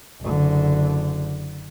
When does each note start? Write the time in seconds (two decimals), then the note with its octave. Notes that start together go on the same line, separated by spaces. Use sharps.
0.21 F#1 D3